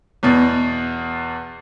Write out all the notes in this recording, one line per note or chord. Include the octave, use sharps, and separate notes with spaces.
E2 B2